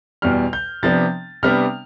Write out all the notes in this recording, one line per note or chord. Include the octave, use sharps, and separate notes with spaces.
E2 B2 G3 F6
G6
C3 F3 B3 D4 A6
C3 G3 B3 D4 F6